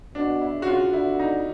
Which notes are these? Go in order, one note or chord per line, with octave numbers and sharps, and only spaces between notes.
B2 D4
E4
C#3
F#4
F4
D3 E4
D#4